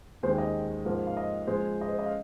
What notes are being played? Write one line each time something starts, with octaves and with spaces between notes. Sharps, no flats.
D#2 D#3 G#3 C4 C5
D#5
G#2 F3 A#3
F5
D#5
A#2 F3 G#3 C5
D#5
C5
D#5
F5